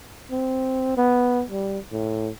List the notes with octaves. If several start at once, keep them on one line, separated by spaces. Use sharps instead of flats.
C4
B3
G3
A2